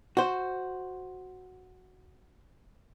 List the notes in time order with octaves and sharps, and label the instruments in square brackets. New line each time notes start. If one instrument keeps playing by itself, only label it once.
[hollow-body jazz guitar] F#4 C5